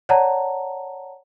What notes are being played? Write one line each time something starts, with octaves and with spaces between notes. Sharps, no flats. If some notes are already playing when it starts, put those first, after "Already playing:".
C#5 D5 F#5 A5 A#5